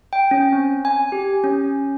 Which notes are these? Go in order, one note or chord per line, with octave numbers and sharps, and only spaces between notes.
G5
C#4
C4
G#5
G4
C#4